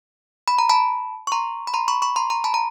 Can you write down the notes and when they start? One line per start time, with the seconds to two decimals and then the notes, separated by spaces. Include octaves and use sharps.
0.48 B5
0.59 A#5
0.69 A5 B5
1.27 C#6
1.32 A#5 C6
1.67 B5
1.74 A#5 C6
1.88 B5 C#6
2.02 B5 C#6
2.16 A#5 C6
2.30 A#5 C6
2.44 A5 B5
2.54 A#5